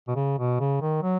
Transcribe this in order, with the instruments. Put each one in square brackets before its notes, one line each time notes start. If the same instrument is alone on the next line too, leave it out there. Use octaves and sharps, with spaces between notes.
[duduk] B2
C#3
B2
C#3
D#3
F#3